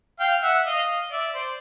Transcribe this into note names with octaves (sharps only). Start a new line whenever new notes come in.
F5 G5
E5 F#5
D#5 F5
D5 E5
C5 D5